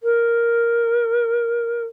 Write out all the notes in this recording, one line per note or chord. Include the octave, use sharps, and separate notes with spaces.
A#4